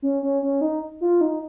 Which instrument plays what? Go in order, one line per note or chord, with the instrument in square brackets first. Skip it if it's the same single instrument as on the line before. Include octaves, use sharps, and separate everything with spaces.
[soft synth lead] C#4
C#4
C#4
D#4
F4
D#4